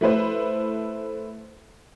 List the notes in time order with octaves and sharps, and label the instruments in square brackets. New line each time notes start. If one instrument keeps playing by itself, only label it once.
[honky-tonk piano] A3 E4 B4 C5